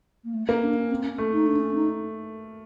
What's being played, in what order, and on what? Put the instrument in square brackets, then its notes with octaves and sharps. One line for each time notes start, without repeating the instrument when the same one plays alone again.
[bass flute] A#3
A3
[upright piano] A#3 [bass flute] C#4
[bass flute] D4
C#4
C4
C#4
[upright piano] A3
[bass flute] D#4
D4
C#4
D#4